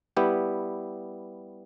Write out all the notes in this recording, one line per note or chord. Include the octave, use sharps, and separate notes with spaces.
G3 B3 E4 G4